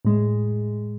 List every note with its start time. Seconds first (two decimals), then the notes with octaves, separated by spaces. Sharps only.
0.05 A2 G#3